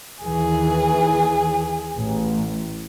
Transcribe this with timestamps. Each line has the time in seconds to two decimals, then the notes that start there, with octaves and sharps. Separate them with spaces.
0.23 D#2 E3 G#4
1.95 A1